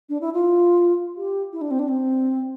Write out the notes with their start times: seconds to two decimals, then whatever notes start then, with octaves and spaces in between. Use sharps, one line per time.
0.09 D4
0.21 E4
0.34 F4
1.17 G4
1.53 E4
1.61 D4
1.71 C4
1.79 D4
1.88 C4